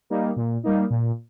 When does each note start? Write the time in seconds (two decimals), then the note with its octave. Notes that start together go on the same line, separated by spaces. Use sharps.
0.10 G3 A#3 D#4
0.36 A#2
0.64 G3 A#3 D#4
0.90 A#2